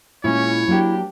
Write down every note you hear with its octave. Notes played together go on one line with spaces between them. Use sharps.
A#2 G#3 C#4 E4 C#5
F#3 A#3 D4 G4